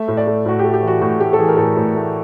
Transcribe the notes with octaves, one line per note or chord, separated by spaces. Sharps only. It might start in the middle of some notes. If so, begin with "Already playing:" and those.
Already playing: A3 E5
A2
D5
A3
A2 F#4
A3 G4
G4
E3
F#4
A2 F#4
A3 G4
A4
E3 G#4
A#4
A2 A4
A2
A3